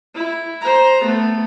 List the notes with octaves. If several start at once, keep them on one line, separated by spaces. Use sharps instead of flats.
E4
C5 A#5
A3 B3